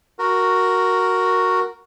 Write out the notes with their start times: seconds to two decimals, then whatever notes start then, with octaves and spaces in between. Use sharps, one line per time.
0.19 F#4 A#4